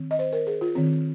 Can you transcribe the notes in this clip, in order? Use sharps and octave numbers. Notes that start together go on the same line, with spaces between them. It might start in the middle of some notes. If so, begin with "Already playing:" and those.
Already playing: D#3 C4
D#5
C5
A#4
G#4
F4
D#3 C4